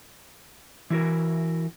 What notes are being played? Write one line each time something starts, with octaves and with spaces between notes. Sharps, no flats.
E3 E4 F#4 A#4